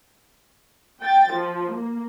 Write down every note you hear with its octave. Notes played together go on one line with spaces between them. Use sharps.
G5 A6
F3
A#3